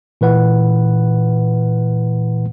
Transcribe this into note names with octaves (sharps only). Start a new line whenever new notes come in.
A#2 E3 B4 F#5